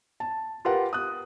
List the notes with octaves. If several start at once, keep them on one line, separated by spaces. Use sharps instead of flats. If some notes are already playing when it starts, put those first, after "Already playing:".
A5
F4 G4 A#4 B4 F#5
D#6 F#6